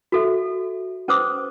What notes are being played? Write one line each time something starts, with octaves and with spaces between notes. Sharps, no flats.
F#4 A4 E5
C#4 B4 C5 D6 D#6